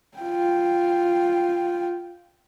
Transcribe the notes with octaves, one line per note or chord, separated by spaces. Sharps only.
F4 G5